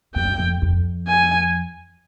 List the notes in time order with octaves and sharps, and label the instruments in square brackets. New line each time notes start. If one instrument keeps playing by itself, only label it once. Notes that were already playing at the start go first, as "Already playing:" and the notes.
[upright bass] F#2 [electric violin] G5
[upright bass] F2
F2
[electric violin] G#5